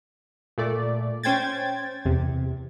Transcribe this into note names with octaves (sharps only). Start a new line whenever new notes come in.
A#2 A3 D5
C#4 C5 G5 G#6 A6
E2 C3